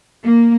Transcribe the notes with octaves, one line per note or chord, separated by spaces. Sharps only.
A#3